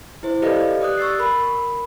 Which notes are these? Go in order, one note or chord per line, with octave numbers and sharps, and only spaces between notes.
E4 C5
G4 A4 B4 D5 D#5 F5
G4 D5 D#6 F#6
C#6 E6 A6 C7
A#4 B5